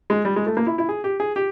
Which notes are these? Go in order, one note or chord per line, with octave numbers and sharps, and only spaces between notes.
G#3
G3
G#3
A3
A#3
E4
E4
G#4
G4
G#4
G4